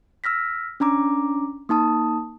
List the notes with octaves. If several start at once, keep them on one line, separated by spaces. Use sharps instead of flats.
E6 F6 A#6 B6
C#4 D4 A#5 D6
A#3 D#4 A5 D#6